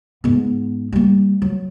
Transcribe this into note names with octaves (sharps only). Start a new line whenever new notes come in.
G#2 B3
G3 A#3
F#3